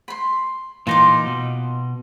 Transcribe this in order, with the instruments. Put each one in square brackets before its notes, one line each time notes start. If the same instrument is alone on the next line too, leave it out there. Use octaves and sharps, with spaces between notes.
[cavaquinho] B5 C6
[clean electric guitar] A#2 E3 D#4 [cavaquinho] F4 C6 D6
[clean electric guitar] B2